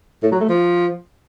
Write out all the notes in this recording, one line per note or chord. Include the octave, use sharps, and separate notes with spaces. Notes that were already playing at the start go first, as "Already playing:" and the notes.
A2
F#3
A3
F3